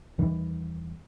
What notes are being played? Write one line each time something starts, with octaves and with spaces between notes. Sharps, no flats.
E2 D#3 E3 G3